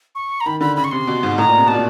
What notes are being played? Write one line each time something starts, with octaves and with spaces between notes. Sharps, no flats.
C#6
A#5
D#3 B5
D3 B5
C#3 B5
C#6
C3 C6
B2
G#2
A2 A#5
A#2
C3
B2 A5
A#2